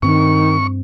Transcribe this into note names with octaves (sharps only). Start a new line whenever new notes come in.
G2 D#3 C4 C#6